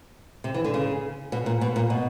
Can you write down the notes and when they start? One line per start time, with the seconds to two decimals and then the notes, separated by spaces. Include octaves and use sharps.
0.44 C3
0.54 E3
0.64 D3
0.74 C#3
1.32 B2
1.46 A#2
1.61 B2
1.76 A#2
1.90 B2